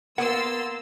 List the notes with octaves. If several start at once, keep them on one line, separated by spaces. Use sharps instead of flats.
A#3 B3 F#5 C6 E6 A6